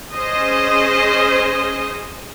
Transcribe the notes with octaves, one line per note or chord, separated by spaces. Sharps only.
C#4 G#4 C5 D#5